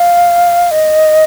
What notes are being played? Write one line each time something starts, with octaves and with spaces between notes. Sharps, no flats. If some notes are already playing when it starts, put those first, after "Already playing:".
Already playing: F5
D#5